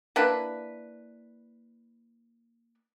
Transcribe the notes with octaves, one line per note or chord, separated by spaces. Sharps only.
A#3 D4 E4 B4